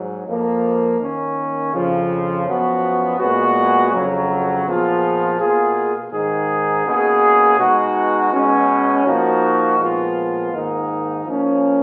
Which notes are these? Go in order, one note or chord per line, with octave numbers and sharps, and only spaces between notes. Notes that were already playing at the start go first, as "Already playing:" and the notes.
Already playing: G#2 F#3
F2 F3 A#3
D#3 A#3 C#4
F2 C#3 F3
F#2 F3 B3 F#4
A#2 G#3 B3 F#4
F2 C#3 F#3
A#2 F3 B3 F4 G#4
B2 A#3 F4 G#4
G#2 D#3 G#3 D#4 G#4
B2 A#3 C#4 G#4
B2 G#3 D#4 F#4
B2 G#3 C#4
F3 A#3 D#4 F#4
A#2 F3 G#3 B3 F4
G#2 D#3 A#3 D#4
F3 A#3 C#4